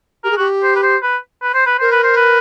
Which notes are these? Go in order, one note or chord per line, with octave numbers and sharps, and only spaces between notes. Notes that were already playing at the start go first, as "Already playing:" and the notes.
G4 A#4
G#4
F#4 G4
C5
B4
C5
B4
B4
C5
B4
A#4 C5
B4
C5
B4